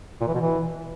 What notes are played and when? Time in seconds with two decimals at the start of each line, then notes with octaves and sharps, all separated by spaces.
0.21 A#2
0.27 E3
0.34 B2
0.41 E3